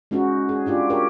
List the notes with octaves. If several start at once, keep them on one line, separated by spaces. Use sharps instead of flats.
G#3 C#4 D#4 F#4
G#4
D4 F4 G4
G4 A#4 C#5